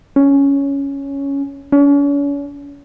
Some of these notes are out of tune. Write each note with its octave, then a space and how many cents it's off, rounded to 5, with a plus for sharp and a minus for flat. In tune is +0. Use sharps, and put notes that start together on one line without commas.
C#4 +5
C#4 +40